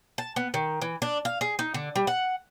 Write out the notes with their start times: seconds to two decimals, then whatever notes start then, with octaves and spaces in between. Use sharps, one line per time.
0.18 A5
0.36 B3
0.54 D#3
0.82 E3
1.02 D4
1.25 F5
1.41 G#4
1.59 D#4
1.74 D3
1.96 G3
2.07 F#5